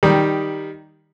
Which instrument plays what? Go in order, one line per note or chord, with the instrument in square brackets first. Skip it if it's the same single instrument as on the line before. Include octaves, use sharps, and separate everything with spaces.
[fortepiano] D#3 G3 D#4